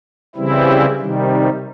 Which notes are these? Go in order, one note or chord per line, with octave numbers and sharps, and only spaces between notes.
C#3 E3 G3 C4 E4
C3 D#3 G3